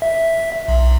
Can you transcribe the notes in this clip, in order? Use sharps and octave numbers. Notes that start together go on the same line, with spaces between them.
E5
B1